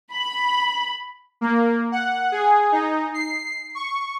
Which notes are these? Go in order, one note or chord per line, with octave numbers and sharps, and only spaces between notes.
B5
A#3
F#5
G#4
D#4
C7
C#6